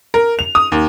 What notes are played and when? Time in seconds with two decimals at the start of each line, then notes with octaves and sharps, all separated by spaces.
0.14 A#4
0.39 F7
0.55 D#6
0.72 D#2